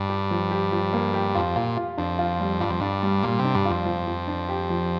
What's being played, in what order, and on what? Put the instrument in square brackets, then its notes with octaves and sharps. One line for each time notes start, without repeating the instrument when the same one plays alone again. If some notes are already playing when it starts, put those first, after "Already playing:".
Already playing: [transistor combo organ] G2
[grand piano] G4
F3
G4
F3
A#3
G4
[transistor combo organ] F2 [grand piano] F4
[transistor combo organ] A#2 [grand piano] F4
[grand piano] F4
[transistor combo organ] F2 [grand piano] D4
[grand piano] F4
G3
[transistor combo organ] G2 [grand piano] F4
[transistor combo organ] F2
[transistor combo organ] G2 [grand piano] D4
[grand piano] G3
[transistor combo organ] A#2 [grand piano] G3
[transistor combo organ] C3
[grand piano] D4
[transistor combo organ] G2
[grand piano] F4
[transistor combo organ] F2
[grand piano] F3
F3
D4
G4
F3